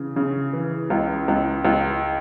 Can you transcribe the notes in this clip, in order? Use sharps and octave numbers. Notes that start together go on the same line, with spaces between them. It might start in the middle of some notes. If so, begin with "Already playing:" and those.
Already playing: C#3 E3
C#3
E3
C#2
C#2
C#2